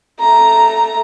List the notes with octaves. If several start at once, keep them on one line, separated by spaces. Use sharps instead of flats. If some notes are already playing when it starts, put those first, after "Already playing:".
A3 A#5